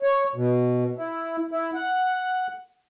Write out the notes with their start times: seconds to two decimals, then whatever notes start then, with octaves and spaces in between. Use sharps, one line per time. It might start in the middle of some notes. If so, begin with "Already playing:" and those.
0.03 C#5
0.36 B2
0.97 E4
1.51 E4
1.74 F#5